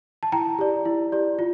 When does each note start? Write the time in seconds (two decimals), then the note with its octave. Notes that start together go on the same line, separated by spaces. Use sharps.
0.23 A5
0.32 E4 G5 A#5
0.59 G4 D5
0.85 E4
1.12 G4 D5
1.39 F4